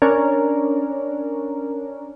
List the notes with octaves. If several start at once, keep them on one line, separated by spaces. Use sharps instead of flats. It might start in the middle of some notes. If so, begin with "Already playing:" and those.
C#4 D4 A#4